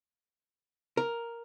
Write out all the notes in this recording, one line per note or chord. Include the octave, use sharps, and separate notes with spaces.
A#4